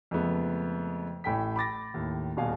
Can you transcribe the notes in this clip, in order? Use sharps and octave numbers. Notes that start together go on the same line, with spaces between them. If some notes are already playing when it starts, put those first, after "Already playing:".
F2 C#3 G#3 A3 B3
A1 A2 A4 G5 G#5 B6
B5 D6 A6 A#6
D#2 A2
D#1 B2 F5 G#5